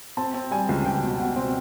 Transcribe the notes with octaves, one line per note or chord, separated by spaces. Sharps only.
C4 A5
C4
G3 G#5
C#2
C#2 G5
B2
B2 F#5
C4